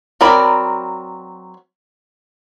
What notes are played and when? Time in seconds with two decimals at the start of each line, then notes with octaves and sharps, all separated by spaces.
0.21 F#3 C4 A#4 D5 B5